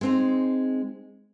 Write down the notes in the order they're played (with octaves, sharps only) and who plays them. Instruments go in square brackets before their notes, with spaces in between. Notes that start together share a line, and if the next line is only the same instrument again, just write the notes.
[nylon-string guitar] G#3 C4 D#4